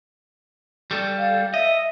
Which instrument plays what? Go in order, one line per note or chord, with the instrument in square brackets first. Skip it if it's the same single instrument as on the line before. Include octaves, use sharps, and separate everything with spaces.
[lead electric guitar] G3 A4
[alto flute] F5
[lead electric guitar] D#5 [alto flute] E5